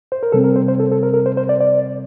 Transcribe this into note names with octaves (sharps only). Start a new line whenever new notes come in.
C5
A#4
C3 G3 C4 A4
A#4
C5
C5
A4
A4
A#4
A#4
C5
C5
D5
D5